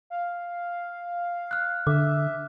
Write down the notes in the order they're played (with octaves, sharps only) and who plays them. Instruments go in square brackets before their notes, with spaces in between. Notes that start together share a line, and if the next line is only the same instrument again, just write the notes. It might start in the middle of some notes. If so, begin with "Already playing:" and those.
[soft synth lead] F5
[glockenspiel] F6 F#6
[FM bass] D3 [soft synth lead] E5 [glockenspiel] D6